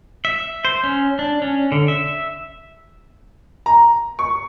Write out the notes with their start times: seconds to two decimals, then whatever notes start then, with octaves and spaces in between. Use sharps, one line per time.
0.25 E5
0.65 C5
0.84 C#4
1.19 D4
1.42 C#4
1.72 D3
1.88 E5
3.66 A#5
4.19 C#6